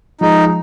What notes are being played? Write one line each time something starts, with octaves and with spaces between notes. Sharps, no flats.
F3 G#3 D#4